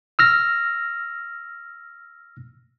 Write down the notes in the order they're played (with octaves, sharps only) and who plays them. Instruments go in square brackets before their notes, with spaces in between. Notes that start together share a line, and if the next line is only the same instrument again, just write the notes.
[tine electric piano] E6 F6 A#6